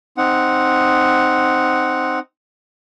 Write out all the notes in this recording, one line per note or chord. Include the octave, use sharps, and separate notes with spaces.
C4 D#4 F#5